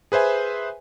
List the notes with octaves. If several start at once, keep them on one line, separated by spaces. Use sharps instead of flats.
G#4 B4 C5 E5 G#5